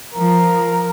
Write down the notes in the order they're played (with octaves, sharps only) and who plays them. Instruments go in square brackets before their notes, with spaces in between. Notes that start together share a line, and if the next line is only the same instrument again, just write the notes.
[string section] F3 [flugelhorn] A#4